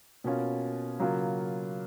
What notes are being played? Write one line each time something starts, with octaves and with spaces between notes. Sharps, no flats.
B2 A#3 C#4 F4
C#3 F#3 A#3 F4